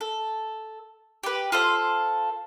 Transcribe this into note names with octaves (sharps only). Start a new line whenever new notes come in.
A4
G4 B4
F4 A4 C5